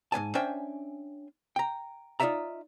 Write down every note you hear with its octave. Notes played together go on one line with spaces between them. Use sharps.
G#2 B3 G#5 A5
C#4 D4 C5 E5 G5 G#5
G5 A#5
D#4 F4 A#4 D5 E5 A#5